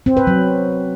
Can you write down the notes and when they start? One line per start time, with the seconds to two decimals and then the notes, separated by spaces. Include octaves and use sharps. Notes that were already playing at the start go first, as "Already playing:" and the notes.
0.06 C4
0.17 B4
0.27 F#3